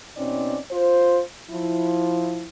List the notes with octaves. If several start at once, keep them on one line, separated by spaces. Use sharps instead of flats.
B2 C4 C#4 D#4 D5
F4 C5
F3 E4